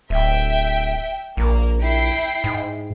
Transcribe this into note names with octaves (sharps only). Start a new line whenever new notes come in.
D1 E5 G5
A#1 A#3
E4 G5 C7
G#2